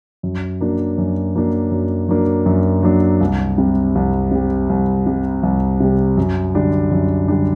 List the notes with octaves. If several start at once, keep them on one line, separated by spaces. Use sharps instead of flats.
F#2
F#3 A#3 D4
F#2
F#3 A#3 D4
F#2
F#3 A#3 D4
F#2
F#3 A#3 D4
C2
C3 G3
C2
C3 G3
C2
C3 G3
C2
C3 G3
F#2
D3 G3 D4
F#2
D3 G3 D4